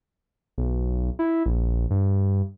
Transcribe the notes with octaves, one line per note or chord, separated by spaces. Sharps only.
B1
E4
A#1
G2